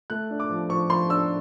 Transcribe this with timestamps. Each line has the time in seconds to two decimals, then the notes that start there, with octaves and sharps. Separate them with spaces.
0.10 A3 F#6
0.30 D4
0.40 D6
0.50 F3
0.69 F3 C#6
0.89 F3 C6
1.09 D4 E6